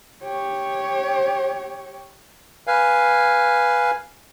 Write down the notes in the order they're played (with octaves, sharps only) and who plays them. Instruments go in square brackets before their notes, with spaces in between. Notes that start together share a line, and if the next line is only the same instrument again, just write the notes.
[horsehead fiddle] G4 C#5
[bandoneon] B4 F5 G#5